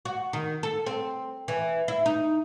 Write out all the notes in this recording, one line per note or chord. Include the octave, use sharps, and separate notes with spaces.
F#4
D#3
A4
C4
E3
E4
D#4